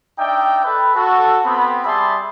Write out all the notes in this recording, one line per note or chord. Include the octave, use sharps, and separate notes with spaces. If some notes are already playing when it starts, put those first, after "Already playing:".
D4 D#4 E5 G5
A4 B4
F#4 A4
B3 C4 B5
G3 G#4 E5 A5 B5 C6